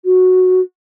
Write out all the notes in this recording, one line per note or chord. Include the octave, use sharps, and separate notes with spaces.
F#4